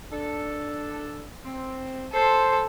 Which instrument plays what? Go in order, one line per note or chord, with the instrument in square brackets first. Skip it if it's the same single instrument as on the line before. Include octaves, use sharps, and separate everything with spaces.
[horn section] D4 A4
C4
[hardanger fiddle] A4 [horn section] C5